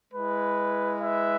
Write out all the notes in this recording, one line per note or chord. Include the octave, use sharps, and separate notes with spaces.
G#3 E4 B4
B4 E5